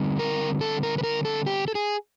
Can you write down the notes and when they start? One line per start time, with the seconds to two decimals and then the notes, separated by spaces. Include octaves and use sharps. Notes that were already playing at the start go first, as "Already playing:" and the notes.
Already playing: D3 G3 C4
0.19 A#4
0.61 A4
0.83 A#4
0.98 B4
1.04 A#4
1.25 A4
1.47 G4
1.68 A4
1.75 G#4